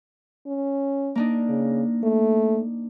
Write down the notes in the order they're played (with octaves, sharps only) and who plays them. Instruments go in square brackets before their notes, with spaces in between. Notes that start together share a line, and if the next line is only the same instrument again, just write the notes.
[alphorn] C#4
[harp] A#3 D4 D#4
[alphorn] C#3
A3